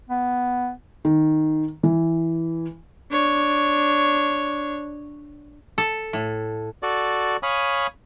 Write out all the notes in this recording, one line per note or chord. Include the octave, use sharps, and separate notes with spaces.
B3
D#3
E3
D4 C#5
A4
A2
F#4 A4 D5
C#5 F5 G#5 B5 D#6